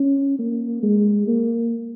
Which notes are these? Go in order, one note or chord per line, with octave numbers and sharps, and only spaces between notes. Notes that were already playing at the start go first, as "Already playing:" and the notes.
Already playing: C#4
A#3
G#3
A#3